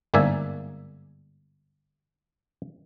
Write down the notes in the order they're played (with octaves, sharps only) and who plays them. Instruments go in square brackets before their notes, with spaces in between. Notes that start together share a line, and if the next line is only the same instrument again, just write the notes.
[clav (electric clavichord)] G1 G#2 A#3 D5 E5 G#5